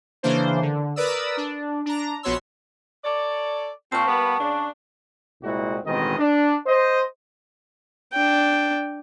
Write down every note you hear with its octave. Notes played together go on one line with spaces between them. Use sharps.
C#3 E3 A#3 D4 C5
D3
A#4 B4 D5 D#6 E6
D4
D4 A#5
A#1 B3 F#4 C#5 C6 E6
A4 C#5 D5
A#2 C4 A5 C#6
G3 A#3 B3
C#3 D4
C2 A#2 G#3 C4 E4 F#4
A1 B2 D#3 G#3 C4 D#5
D4
C5 D#5
D4 G5